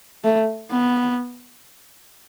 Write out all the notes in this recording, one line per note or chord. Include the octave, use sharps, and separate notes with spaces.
A3
B3